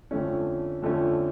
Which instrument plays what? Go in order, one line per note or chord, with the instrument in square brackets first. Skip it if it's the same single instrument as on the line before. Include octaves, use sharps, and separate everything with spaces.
[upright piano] F2 D3 F3 A3 C#4
F2 D3 F3 A3 C#4